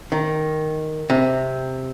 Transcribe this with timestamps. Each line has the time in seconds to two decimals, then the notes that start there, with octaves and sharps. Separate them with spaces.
0.12 D#3
1.10 C3